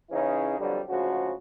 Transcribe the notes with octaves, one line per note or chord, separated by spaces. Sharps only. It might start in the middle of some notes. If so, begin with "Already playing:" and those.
C#3 E3 C#4 D#4 E4 G#4
F2 B2 D3 F#3 G3
D2 G#2 C#3 F3 F#4